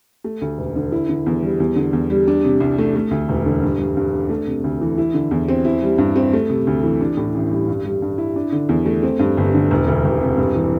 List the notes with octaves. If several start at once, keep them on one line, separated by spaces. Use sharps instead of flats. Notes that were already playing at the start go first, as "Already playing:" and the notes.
A3
D2
E1
D3
E4
D3
E2
G3
E2
D3
E2
G3
D4
C3
C2
A3
A3
D2
E1
D3
G2
G3
G2
D4
A3
C3
D2
E3
E4
D3
E2
C4
E4
G3
G2
C4
A3
C3
D2
E3
D4
A2
A1
G3
G2
G3
G2
E4
D4
D3
E2
A3
C4
G2
G1
D3
E1
D2
E1
C3
G2
E3